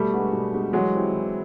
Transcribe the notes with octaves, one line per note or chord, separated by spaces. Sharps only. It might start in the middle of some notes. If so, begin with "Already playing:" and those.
Already playing: B2 G3 A3
G#3 B3 D4 F#4
B2
G#3 B3 D4 F#4
E3 F#3 G#3
G3 C4 E4 G4
E3